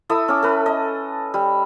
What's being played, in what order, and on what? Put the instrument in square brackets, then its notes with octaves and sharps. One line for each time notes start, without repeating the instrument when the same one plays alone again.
[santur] E4 A4 E5 D#6
C#4 D6
A4 B4
D#5
G3